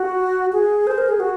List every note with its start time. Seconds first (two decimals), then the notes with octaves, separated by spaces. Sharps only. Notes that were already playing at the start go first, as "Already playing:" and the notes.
Already playing: F#4
0.52 G#4
0.87 C5
0.98 A#4
1.08 G#4
1.20 F#4